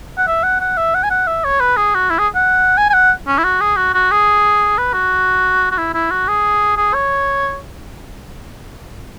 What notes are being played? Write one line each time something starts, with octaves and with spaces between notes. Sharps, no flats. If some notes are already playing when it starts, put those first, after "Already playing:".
F#5
E5
F#5
F#5
E5
F#5
G#5
F#5
E5
C#5
B4
G#4
F#4
E4
G#4
F#5
G#5
G#5
F#5
C#4
E4
F#4
G#4
F#4
F#4
G#4
B4
F#4
F#4
E4
E4
F#4
G#4
G#4
C#5